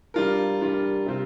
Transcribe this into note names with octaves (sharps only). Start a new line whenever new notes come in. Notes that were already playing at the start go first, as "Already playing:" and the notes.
G3 D4 F4 A#4
G3 D4 F4 A#4
C3 G3 C4 F4